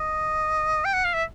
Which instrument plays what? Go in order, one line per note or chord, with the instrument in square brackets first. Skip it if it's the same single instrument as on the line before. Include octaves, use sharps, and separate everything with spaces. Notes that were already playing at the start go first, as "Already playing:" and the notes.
Already playing: [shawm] D#5
G5
F#5
F5
E5